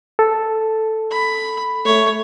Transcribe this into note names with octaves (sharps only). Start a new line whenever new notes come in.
A4
B5
A3 C#5